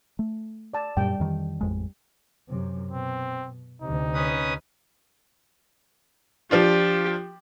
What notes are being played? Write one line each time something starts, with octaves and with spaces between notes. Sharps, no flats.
A3
D5 A5
F#2 A#2 G3 G5
F2 D#3 E3
A1 F2 G#3
F#2 C3
B2 C4
D2 C3 D#4
C#4 B4 D#6
F3 D4 F4 G4